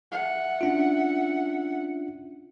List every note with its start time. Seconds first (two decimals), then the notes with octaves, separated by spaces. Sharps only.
0.12 E5 F#5
0.61 C#4 D4 F4